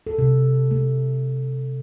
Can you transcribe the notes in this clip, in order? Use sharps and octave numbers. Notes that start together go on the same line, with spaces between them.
A4
C3
A3